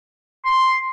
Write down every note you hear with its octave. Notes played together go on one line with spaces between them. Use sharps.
C6